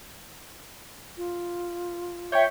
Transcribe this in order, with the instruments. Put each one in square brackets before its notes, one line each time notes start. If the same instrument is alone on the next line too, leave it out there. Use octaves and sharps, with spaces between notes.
[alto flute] F4
[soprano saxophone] C#5 [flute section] E5 [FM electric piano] G5 C#6 G6